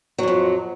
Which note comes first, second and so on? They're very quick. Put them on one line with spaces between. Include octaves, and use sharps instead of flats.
F#3 G#2 F2